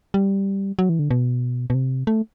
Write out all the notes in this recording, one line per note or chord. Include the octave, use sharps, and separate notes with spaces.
G3
F#3
E3
D3
B2
B2
C3
A3